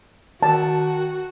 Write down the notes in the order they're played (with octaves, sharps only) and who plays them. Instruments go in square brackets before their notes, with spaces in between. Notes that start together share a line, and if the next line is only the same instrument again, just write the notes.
[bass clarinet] D#3 [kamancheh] F#4 [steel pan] A5